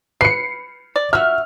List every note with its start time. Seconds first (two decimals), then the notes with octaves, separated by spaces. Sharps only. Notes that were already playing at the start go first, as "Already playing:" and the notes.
0.21 B4 C7 C#7
0.96 D5
1.13 F#4 E5 F6